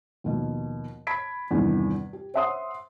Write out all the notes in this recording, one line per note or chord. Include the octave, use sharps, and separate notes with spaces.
D#2 B2 F3
A5 B5 G#6 B6 D7
E2 G2 C3 D#3 E3
G4
C5 C#5 E5 F#5 C6 D#6